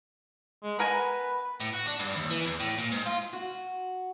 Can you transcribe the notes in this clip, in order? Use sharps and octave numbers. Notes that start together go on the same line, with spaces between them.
G#3
B3 A#4 B4 G#5
A2
F#4
D4
G2
D#2
E3
E2
A2
A#2
G#2
F4
F#4